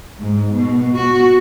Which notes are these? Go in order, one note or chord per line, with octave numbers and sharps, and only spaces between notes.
G#2
B2
F#4